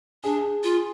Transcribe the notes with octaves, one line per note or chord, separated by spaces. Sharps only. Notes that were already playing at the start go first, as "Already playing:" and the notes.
D4 G#4
F4